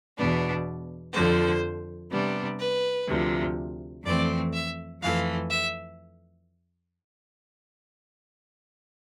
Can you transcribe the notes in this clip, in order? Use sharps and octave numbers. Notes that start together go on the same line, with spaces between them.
E2 B2 B3 D4
F2 D3 F3 C5
C3 G3 B3 D4
B4
D2 C3 F3
F2 E3 A3 C4 D5
E5
F2 E3 A3 F5
E5